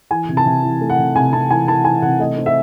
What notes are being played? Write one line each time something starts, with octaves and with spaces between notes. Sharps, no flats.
E3 G#5
C3
A5
C3
E3
A3
F#5
C3
C3 G#5
C3 A5
E3 G#5
E3 A5
E3 G#5
C3 F#5
A3 D#5
C4
E5